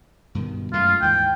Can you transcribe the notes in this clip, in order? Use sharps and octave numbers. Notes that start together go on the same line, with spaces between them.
G2 B2 D#3
F#2 G#3 A3 F4
D#2 G#2 E3 G5